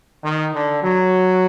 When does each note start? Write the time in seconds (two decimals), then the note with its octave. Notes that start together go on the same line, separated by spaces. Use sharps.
0.24 D#3
0.54 D3
0.83 F#3